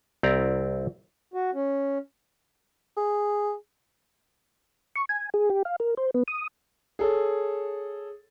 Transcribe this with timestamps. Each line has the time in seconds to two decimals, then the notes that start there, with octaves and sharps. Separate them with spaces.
0.23 C2 C4 E4 D5 A#5
1.34 F#4
1.54 C#4
2.97 G#4
4.96 C#6
5.09 G#5
5.34 G#4
5.50 G4
5.65 F5
5.80 A#4
5.97 C5
6.14 B3
6.28 D#6
6.99 G#4 A4 C#5